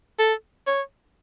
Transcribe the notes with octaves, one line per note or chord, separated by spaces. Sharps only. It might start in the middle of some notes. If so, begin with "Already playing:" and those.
A4
C#5